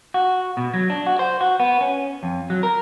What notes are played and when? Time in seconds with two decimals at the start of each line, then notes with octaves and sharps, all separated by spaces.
0.14 F#4
0.57 B2
0.74 F#3
0.90 D4
1.06 F#4
1.19 C5
1.41 F#4
1.60 B3
1.81 C#4
2.23 F2
2.50 F#3
2.63 A#4